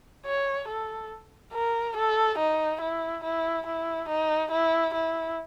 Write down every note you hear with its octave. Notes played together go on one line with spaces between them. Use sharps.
C#5
A4
A#4
A4
D#4
E4
E4
E4
D#4
E4
E4